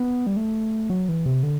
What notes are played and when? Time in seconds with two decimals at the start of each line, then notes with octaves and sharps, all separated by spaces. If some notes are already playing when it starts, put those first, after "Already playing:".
Already playing: B3
0.27 G3
0.37 A3
0.90 F#3
1.09 E3
1.26 C3
1.43 D3